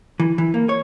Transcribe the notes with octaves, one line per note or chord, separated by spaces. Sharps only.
E3
E3
A#3
C#5